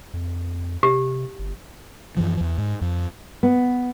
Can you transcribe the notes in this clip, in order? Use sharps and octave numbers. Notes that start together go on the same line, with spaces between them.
F2
C3 G4
G1
F#2 E3 F3
E2
G#2
F2
B3